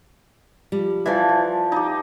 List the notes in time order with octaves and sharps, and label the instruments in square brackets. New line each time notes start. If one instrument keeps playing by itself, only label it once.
[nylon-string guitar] F3 G3
[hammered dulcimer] E3 F3 [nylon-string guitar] D5 E5
[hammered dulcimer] F3
D#4 G4